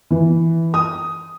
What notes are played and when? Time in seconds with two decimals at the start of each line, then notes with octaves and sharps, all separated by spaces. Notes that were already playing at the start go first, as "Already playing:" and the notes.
0.11 E3
0.74 D#6